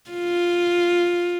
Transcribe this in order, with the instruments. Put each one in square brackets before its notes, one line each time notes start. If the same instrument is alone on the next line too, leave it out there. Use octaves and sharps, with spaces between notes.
[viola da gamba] F4